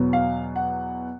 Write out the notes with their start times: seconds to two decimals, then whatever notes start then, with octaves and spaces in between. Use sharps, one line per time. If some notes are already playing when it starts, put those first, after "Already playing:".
Already playing: E2 B2 F#3 B3
0.13 F5
0.56 F#5